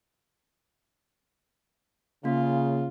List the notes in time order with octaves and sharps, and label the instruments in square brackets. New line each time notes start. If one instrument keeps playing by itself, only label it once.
[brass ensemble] C#3 [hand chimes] A#3 [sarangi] F4